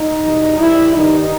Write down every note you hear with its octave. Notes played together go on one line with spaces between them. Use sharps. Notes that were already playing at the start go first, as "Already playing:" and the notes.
Already playing: D#4
E2 B2 G3
A#1 A#2 G3 E4
G2 D#3 G3 D#4